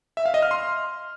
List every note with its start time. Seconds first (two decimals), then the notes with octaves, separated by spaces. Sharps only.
0.17 E5
0.26 F5
0.34 D#5
0.42 F6
0.51 C6